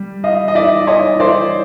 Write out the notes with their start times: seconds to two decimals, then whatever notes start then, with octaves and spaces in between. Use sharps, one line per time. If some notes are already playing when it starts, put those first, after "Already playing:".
Already playing: G3
0.24 D#5 F5
0.48 D#5
0.55 D5 E5
0.87 C#5 D#5
1.20 C5 D5